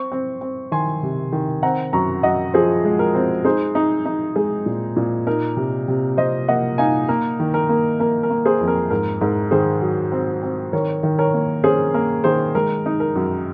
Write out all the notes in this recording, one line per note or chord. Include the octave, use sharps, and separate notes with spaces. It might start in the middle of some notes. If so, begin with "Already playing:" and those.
Already playing: C4 C#6
C4
C4
D#3 G#5 C6
C3
D#3
C4 F#5 A#5
F#2 A#5 C#6
F#2 D#5 F#5
F3 G#4 C5
G#3
A#4
C4
D#4 G#4 C5
D#4
D#4
G#3 G#4
A#2
A#2
D#4 A#4
C3
C3
C3 C5 D#5
A#3 D#5 F#5
D#4 F5 G#5
A#3 A#4
D#3
A#4
A#3
A#3 A#4
A#4
A#3
G#4 C5
F2
A#4
G#2 A#4
G#2 A#4
D#3 G#4 C5
F#3
C4
C4
D#3 A#4 C#5
D#3
A#4 C#5
A#3
C#4 G#4 C5
A#3 A#4
D#3 G#4 C5
G#3 A#4
D#4
A#4
F#2